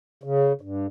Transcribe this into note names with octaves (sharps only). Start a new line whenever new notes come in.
C#3
G2